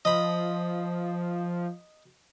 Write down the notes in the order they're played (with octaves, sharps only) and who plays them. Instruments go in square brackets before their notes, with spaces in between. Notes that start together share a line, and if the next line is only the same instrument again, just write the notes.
[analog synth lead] F3 [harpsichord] D#5 B5